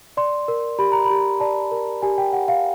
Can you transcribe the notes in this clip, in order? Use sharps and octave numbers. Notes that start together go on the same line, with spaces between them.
D5 C6
A#4
G4 B5
A#5
B5
G4
D5 A5
A#4
G4 G#5
G5
G4 F#5
F5